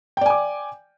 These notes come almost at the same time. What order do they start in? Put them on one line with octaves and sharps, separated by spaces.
G5 D5 G#5 D6